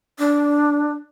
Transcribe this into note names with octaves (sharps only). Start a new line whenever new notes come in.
D4